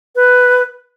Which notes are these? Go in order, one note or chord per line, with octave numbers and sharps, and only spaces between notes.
B4